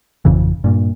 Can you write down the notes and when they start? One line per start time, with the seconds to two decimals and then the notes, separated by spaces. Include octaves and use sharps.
0.25 G#1 F2 C#3 E3
0.64 G2 A#2